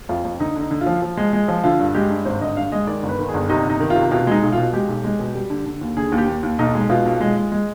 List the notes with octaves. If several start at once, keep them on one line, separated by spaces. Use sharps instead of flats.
F2 F4
F2
D3 D#4
D3
D#4
D3
F4
F3
F3
G#3
G#3
F3
D3 F4
G2
G#3 G4
G2
G#1 C5
D3 D#5
G2 F5
G#3 D#5
D#3 D5
G1
B4
D#3
G#4
G1
C3 D#4
G1 D#4
D#3
F4
C3
B2 F4
G#3 D#4
B1
B2 F4
G#3 G4
B1
G#3
B2
G3
D3
D3
D#2
D3 G#4
D#2
G4
D#2
D#2
B1 D#4
G#3
B2 F4
B1
G#3
G#3
G#3